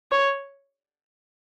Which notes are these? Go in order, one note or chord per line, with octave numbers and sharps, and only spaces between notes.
C#5